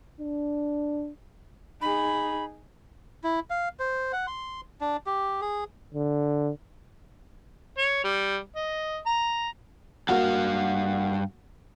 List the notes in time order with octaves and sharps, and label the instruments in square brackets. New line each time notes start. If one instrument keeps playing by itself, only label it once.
[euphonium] D4
[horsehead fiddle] D#4 G#4 [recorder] B5
[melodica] E4
F5
C5
F#5
C6
D4
G4
G#4
[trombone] D3
[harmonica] C#5
G3
D#5
A#5
[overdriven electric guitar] G2 F5 [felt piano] A#3 F#4 F#5